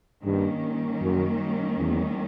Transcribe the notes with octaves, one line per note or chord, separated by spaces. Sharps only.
G2 D#3 G3 A#3 C#4
F#2
E2